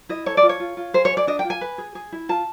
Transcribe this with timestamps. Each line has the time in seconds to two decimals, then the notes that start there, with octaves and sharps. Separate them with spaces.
0.09 E4 D#5
0.26 A4 C#5
0.37 D5
0.43 F4
0.49 C#5
0.60 F4
0.77 F4
0.94 G#4 C5
1.05 C#5
1.11 G#4
1.17 D5
1.27 D4 D#5
1.39 G5
1.44 F4
1.50 G#5
1.61 B4
1.78 G#4
1.95 G#4
2.12 E4
2.29 F4 A5